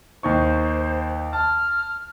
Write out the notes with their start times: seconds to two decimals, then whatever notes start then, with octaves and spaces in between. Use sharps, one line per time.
0.23 D#2 D#4 C5 C#6
1.33 A5 F6